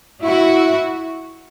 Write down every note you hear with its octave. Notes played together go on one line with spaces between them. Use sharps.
E4 F#4